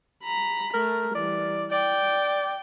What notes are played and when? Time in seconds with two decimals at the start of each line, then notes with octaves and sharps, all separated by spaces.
0.23 A#5 B5
0.74 A3 A#4
1.15 E3 G3 D5
1.72 D5 G5